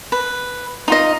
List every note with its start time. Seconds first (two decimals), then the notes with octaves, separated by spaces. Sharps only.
0.12 B4
0.88 D#4 F4 D#5